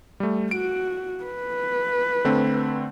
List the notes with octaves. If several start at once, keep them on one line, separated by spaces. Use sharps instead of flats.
G3 A3
F#4 D7
B4
D3 A3 C4